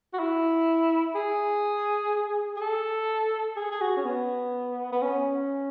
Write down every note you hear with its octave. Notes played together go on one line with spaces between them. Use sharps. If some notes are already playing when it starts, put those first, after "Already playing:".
F#4
E4
G#4
G#4
A4
G#4
G#4
F#4
C#4
B3
B3
C#4